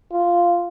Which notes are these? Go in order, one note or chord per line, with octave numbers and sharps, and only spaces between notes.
F4